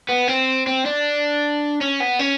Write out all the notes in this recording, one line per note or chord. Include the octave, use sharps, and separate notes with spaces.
B3
C4
C4
D4
C#4
B3
C#4